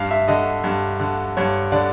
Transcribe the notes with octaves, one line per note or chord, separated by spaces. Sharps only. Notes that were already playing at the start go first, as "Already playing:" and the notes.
Already playing: G2 F5
E5
D3 D#5
G2
D3
G2 C#5
D3 D5